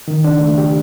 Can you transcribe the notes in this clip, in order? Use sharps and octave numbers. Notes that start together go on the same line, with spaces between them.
D#3
D4
A3
G4